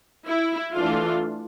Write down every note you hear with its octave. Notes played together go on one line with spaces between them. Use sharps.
E4
E3 A3 D4 F4